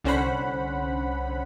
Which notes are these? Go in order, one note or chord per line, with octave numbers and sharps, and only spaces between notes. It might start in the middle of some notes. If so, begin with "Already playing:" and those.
C2 D3 C#4 C5 F#5 B5